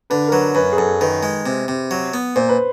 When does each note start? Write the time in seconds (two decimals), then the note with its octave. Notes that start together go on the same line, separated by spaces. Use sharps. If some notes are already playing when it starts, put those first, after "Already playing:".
0.10 D3 B4
0.29 A#4
0.32 F#3 B4
0.55 F#2 B4
0.73 G#4
0.77 F#2 A4
1.01 D#3 B4
1.23 G#3
1.46 C3
1.68 C3
1.91 F#3
2.14 B3
2.36 A#2 C5
2.49 B4